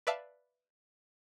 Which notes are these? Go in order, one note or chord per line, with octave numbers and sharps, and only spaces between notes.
B4 D5 E5 F5 A5